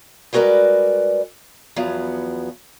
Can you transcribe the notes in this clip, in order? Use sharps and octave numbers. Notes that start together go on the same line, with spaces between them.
G3 G#3 F#4 A#4 B4 D5
E2 F3 F#3 B3